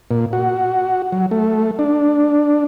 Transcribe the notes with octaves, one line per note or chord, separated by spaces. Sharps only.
A#2
F#4
F#3
A3
D4